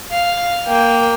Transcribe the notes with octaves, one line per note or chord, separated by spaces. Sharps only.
F5
A#3 G5